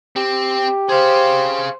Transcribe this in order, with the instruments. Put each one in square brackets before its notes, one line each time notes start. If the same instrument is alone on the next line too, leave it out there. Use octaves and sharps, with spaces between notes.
[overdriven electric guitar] C4 [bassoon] G4
[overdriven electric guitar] G#4 F5 [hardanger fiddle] C5